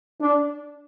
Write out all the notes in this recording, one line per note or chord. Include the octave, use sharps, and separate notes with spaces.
D4